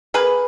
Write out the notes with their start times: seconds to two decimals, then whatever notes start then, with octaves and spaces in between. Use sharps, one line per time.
0.14 A#3 G#4 B4